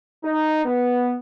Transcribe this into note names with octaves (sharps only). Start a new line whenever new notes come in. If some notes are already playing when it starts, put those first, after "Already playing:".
D#4
B3